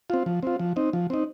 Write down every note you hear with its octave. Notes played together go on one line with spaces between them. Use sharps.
C4 F4
F3
C4 F4
F3
C4 D#4
F3
C4 D#4